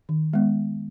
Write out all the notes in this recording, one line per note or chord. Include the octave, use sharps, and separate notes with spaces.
D#3
G#3 B3